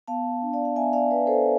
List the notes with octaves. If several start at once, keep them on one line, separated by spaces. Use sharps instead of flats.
B3 F5 A5
D4
D5 F5
F5
B3 E5 G#5
D5 F5
B3 B4 D5
A4 C5